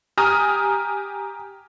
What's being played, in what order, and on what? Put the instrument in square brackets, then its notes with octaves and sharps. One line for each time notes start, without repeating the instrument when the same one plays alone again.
[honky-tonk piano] G4 G#5 A#5 D#6 F6